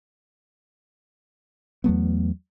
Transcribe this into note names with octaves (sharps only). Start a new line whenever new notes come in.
E2 F#3 A3 B3